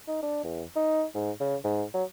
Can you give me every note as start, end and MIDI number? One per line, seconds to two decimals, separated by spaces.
0.08 0.20 63
0.23 0.39 62
0.44 0.63 40
0.76 1.04 63
1.15 1.31 44
1.40 1.56 49
1.64 1.84 44
1.94 2.04 54